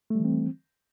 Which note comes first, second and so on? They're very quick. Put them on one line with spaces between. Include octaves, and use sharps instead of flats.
A3 G3 E3 C4